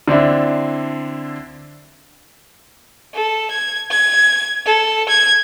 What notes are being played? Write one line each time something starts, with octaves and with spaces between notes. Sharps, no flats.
D3 C4 D4 E4
A4
G#6
G#6
A4
G#6